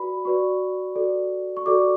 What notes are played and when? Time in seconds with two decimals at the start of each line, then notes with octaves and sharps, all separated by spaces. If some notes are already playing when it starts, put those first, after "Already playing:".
Already playing: F#4 B4 D5 B5
0.25 F#4 B4 D5 C#6
0.96 F#4 A4 D5
1.57 C#6
1.66 F#4 A4 D5 D6